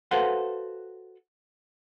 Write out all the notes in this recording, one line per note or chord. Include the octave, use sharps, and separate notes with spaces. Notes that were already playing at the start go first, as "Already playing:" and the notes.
F#4 A4 B4 C5 F5 F#5